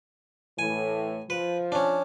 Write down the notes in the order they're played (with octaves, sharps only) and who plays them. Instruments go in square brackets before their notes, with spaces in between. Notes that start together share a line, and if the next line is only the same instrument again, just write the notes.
[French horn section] A2 E3 [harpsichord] G#5
[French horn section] F3 [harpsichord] B4
[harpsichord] C#4 D4